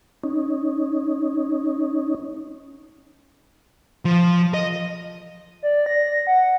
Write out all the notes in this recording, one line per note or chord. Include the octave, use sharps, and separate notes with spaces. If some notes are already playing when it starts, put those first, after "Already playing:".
C#4 D#4
F3
D#5
D5
A#6
F#5